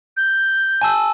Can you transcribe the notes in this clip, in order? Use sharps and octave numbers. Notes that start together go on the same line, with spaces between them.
G6
G#5 A5 E6